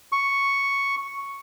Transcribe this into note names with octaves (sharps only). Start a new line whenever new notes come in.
C#6